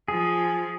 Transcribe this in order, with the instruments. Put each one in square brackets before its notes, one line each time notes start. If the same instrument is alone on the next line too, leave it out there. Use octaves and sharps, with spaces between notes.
[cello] F3 [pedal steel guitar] G#4